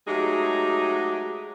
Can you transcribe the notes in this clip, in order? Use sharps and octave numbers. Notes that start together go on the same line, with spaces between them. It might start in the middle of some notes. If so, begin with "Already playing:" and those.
F#3 G#3 A3 D#4 G4 G#4